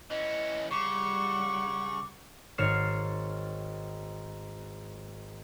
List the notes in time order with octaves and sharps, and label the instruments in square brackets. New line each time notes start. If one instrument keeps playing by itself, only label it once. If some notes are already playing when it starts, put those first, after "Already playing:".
[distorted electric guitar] E3 C#4 [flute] D#5
[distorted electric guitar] C#3 [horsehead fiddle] G3 F#5 [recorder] C#6 [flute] D6
[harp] G#1 C#5 F6 C7 E7